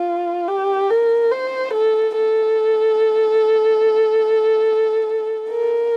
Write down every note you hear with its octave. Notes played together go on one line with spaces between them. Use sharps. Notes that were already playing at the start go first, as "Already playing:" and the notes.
Already playing: F4
G4
A#4
C5
A4
A4
A#4